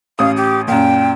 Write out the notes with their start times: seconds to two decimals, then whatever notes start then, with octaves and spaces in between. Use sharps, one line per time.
0.19 A1 F5 D#6
0.37 G4
0.68 F#2 A#2 G5